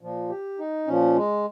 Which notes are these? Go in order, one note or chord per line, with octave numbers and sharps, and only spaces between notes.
A#2 F3
G4
D#4
A#2 F3 C#4
G#3